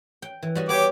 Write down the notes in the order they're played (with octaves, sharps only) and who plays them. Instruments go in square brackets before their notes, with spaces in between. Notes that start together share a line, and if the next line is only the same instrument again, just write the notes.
[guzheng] G5
E3
G3 F#4 D#5
[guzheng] B3 C#5 [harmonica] G4 D6